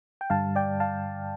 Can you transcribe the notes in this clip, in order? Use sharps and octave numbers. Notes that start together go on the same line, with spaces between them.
G5
G2 D3 G3 F5 A5
D5 G5
F5 A5